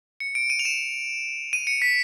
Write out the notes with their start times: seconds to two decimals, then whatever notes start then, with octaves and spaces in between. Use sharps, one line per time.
0.20 C#7
0.35 D7
0.50 D#7
0.59 F7
0.65 E7
1.53 D#7
1.67 C#7
1.82 B6